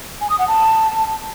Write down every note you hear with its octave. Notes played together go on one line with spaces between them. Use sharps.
G#5
D#6
F#5
A5